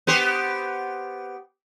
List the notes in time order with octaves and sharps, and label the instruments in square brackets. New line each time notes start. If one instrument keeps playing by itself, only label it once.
[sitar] B3 G4 C5